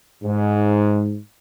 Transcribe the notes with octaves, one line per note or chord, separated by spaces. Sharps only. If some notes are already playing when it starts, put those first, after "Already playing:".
G#2